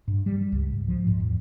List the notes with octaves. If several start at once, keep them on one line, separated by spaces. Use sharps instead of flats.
G2
G3
G3
C#2
G#2
F3
G#2
E2